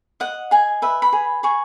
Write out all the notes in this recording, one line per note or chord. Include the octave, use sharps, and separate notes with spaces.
D#5 F#5
G#4 G#5
B4 E5
B5
G#4
G#4 C#6